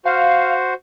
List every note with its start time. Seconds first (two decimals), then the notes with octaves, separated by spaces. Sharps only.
0.05 F#4 C5 F5